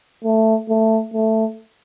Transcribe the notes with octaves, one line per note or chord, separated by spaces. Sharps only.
A3
A3
A3